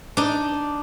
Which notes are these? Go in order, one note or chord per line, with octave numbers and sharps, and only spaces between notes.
D4 D#4